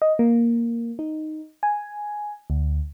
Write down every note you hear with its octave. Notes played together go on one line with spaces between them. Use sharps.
D#5
A#3
D#4
G#5
D2